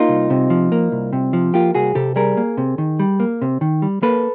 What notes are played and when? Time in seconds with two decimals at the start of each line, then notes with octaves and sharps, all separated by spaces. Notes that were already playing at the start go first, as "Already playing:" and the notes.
Already playing: A#3 D#4 F4
0.09 C2
0.30 C3
0.50 F3
0.72 A#3
0.92 C2
1.13 C3
1.33 F3
1.54 A#3 F4 G4
1.75 C2 F#4 G#4
1.95 C3 G4 A4
2.16 G3 G#4 A#4
2.37 A#3
2.57 C3
2.78 D#3
2.99 G3
3.20 A#3
3.42 C3
3.61 D#3
3.82 G3
4.03 A#3 A4 B4